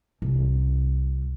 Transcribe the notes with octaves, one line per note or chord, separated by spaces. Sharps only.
C2